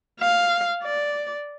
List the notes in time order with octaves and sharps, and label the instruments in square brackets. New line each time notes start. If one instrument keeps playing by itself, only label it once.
[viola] F5
D5